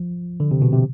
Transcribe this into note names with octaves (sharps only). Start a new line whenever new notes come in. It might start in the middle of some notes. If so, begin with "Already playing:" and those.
Already playing: F3
D3
C3
B2
C3